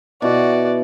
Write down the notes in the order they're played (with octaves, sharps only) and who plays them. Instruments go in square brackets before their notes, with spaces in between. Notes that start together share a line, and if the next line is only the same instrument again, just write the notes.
[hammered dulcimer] B2 E4 [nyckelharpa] F#4 D5